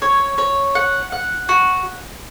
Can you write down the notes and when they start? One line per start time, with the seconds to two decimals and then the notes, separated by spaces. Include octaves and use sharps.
0.02 C#5
0.38 C#5
0.75 F#5
1.12 F#5
1.49 F#4